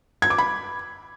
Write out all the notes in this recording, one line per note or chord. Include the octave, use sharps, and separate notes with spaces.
G#6
D6
B5